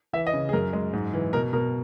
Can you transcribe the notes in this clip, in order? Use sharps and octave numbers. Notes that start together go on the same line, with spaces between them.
E3 E5
D#5
C#3
G#4
F#2 A#4
G#3
G#2
E3
B2 A#4
B2 A#4